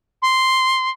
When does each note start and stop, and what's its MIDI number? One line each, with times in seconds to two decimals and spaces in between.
0.22 0.90 84